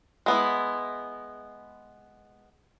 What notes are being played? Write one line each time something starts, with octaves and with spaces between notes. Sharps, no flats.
G#3 B3 E4